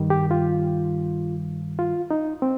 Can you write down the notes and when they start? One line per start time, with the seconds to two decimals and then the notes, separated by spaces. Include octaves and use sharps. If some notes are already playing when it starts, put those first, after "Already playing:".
Already playing: G2 D#3 G3
0.10 G4
0.31 F4
1.79 F4
2.11 D#4
2.42 C4